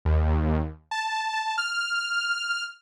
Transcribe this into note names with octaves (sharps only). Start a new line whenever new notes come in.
D#2
A5
F6